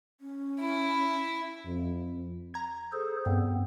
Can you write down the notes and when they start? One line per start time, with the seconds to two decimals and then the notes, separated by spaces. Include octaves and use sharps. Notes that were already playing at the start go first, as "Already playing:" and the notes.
0.21 C#4
0.60 E4
1.65 F2
2.54 A#5 G#6
2.92 G#4 A4 C5
3.26 G2 B3 C4